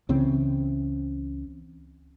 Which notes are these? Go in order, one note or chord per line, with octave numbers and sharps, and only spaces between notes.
C#2 C#3 E3 C4